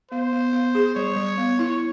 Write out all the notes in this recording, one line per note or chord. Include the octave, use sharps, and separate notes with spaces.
B3 C5
B3
B3
G#4
G3 C#5
G3
B3
E4